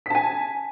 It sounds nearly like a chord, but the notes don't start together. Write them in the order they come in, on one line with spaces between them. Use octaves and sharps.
B6 A5 G#5